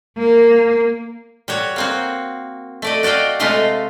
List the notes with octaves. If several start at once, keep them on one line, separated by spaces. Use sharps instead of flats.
A#3
G3 F#4 C#5
A#3 C4 F#4
A3 D5 D#5
F#4 D5 D#5 F5 G5
C3 G#3 A3 F4 D#5 F5